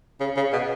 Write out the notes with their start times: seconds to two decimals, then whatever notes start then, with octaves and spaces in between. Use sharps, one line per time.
0.20 C#3
0.36 C#3
0.53 B2